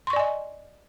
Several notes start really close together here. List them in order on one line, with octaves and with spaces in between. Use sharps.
C6 C#6 D5 G#5 D#5